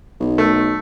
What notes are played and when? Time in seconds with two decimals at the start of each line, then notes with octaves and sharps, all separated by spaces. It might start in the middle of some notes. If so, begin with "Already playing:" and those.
0.20 B1
0.38 A3